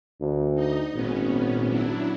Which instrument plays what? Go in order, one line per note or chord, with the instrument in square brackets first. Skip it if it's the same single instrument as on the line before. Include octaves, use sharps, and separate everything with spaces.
[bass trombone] D2
[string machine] D#4 D#5
[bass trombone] G#1 [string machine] A#2 B3 C#4
[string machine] F#3 D4 E4